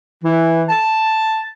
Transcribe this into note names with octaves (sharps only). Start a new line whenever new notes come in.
E3
A5